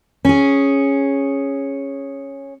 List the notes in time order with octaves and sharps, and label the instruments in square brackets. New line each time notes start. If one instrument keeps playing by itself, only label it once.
[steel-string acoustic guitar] C#4 G#4